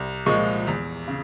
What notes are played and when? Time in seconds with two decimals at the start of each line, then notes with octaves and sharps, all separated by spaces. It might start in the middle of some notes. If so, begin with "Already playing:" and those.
Already playing: C2
0.26 A#2 F3 G#3 C#6
0.67 E2
1.08 C#3